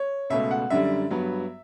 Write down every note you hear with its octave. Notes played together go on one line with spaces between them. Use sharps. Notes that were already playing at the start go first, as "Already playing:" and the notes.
Already playing: C#5
C#2 B2 A3 E5
F#5
F#2 D3 G3 E5
G2 F#3 B3